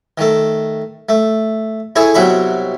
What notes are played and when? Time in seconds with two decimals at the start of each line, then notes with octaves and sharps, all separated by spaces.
0.18 D#3 A3
1.09 A3
1.96 E4 G#4 A4 C#5
2.14 C2 B2 F#3 E5 B5 C#6